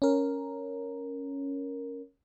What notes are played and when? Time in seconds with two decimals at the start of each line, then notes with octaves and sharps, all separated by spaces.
0.02 C#4 A#4